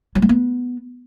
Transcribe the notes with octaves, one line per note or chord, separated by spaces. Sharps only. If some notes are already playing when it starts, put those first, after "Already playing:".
F#3
G#3
B3